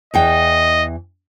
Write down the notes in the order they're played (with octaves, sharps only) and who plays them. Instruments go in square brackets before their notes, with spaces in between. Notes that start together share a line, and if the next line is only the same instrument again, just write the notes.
[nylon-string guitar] E2 E3 G5 [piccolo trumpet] D#5